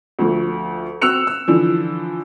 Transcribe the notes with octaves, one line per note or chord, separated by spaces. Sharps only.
D2 F3 A3
C4 F#4 E6 F#6 C#7 F7
E6
D3 E3 F3